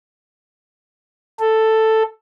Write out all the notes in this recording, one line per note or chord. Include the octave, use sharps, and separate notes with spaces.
A4